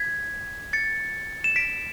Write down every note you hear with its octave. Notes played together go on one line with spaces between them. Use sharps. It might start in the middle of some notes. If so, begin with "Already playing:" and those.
Already playing: G#6 B6
A6 C#7
E7
B6 D7